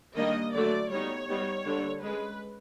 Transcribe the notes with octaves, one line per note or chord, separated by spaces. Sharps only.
D#3 G3 A#3 D4 D#5
D3 F#3 A3 D5
G3 B3 D#4 C#5
G3 B3 D#4
D3 G3 A#3 D4
G#3 C#4 B4